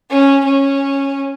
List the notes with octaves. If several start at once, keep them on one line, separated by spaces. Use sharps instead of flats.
C#4
C#4